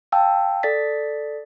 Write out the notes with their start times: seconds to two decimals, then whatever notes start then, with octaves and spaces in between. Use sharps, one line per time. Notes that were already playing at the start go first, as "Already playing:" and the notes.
0.12 F5 G5 A5 E6
0.63 A4 D5 A6 B6